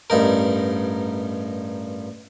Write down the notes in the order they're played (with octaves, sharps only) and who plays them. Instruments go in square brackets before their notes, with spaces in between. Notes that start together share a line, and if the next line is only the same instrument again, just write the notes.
[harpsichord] A1 G2 D#4 A#4